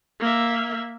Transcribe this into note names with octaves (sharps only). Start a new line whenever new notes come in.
A#3 E5